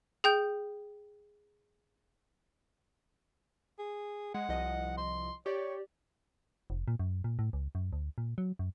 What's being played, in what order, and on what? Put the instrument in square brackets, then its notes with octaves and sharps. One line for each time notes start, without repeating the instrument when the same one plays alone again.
[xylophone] G#4 G5 G6
[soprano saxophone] G#4
[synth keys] G#3 [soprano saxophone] F#5
[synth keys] C2 F3 D#5
[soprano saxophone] C6
[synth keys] G4 D5 [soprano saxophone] C#5
[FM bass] F1
A#2
F#2
A#2
A2
C#2
F#2
D2
A#2
F#3
F#2